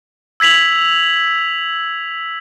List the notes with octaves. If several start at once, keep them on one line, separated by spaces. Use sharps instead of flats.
E6 G#6 B6 F7 F#7